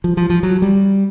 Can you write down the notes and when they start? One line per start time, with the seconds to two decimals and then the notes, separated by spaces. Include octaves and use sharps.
0.04 F3
0.17 F3
0.30 F3
0.43 F#3
0.62 G3